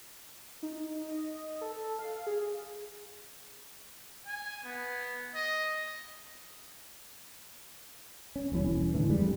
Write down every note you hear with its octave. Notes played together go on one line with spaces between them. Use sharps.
D#4
D#5
A4
F5
G#4
G#5
B3
D#5
C#4
D#1 B1 E3 C#4
A2 D3 E3
F2 G3 G#3